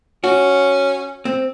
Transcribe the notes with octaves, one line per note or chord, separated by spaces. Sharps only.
C#4 F#4
C4